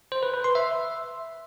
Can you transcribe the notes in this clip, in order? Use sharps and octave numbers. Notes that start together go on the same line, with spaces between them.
C5
B4
B4
C6
E5